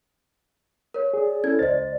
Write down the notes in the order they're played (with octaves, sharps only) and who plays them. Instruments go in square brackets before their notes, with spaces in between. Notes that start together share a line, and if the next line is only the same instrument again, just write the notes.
[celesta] A#4 C#5
[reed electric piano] G#4 [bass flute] D5
[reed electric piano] C#4 E4 A4 [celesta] G#6
[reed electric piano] C#2 A6 [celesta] C5 D#5